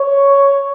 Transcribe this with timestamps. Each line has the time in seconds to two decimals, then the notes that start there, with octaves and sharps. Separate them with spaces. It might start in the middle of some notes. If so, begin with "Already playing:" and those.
Already playing: C#5